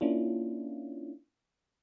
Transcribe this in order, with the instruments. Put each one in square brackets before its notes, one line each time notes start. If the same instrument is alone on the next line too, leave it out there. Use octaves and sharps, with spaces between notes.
[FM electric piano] A#3 C#4 D4 E4 F4